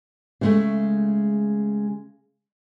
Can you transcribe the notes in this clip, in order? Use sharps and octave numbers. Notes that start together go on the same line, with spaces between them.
C#3 G#3 A3